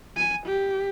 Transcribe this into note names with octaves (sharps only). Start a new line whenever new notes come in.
G#5
G4